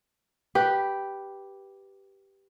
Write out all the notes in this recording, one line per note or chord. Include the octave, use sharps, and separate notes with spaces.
G4 B4